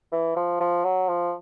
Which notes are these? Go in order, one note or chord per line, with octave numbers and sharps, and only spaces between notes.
E3
F3
F3
F#3
F3